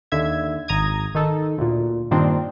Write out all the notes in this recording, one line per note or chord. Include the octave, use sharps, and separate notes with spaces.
D#2 D3 E5 G#6
G#1 A#5 D#6 G#6
D#3 D#4 A4
D2 A#2
G2 A#2 D#3 C4 D4